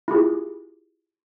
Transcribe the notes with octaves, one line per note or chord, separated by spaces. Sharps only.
E4 F4 G4 G#4